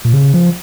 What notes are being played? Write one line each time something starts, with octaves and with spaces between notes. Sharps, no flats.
A#2
C#3
F3